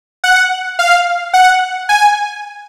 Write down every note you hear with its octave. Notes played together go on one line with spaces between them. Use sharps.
F#5
F5
F#5
G#5